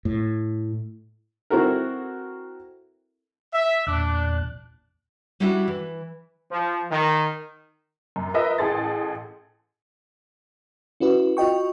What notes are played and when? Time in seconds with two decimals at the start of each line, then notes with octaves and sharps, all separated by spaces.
0.05 A2
1.50 C4 E4 F#4 A4 A#4
3.54 E5
3.87 E2 A#2 D4 F#6
5.40 G3 C#4 D4 E4 F#4 E5
5.68 E3
6.50 F3
6.91 D#3
8.16 F#2
8.34 F4 A#4 B4 D#5 E5
8.58 A1 G#4 A4 C6 A6
11.00 C#4 E4 F#4 B4
11.37 F4 F#4 D#5 G5 C#6